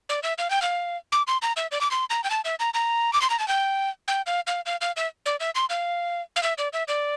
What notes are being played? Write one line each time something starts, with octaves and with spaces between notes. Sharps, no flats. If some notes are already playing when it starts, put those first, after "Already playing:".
D5
E5
F5
G5
F5
D6
C6
A#5
E5
D5
D6
C6
A#5
G5
A5
E5
A#5
A#5
D6
C6
A#5
A5
G5
G5
F5
F5
F5
F5
E5
D5
E5
C6
F5
F5
E5
D5
E5
D5